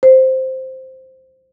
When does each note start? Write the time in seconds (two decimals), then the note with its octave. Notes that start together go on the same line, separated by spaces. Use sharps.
0.03 C5